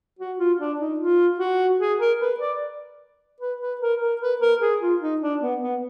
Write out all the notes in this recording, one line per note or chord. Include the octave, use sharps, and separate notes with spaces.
F#4
F4
D4
D#4
F4
F#4
G#4
A#4
B4
D5
B4
B4
A#4
A#4
B4
A#4
G#4
F4
D#4
D4
B3
B3